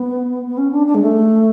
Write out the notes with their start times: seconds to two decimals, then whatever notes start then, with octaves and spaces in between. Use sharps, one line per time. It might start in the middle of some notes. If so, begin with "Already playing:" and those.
Already playing: B3
0.46 B3
0.58 C#4
0.72 D4
0.87 D4
0.94 G#3
1.02 A3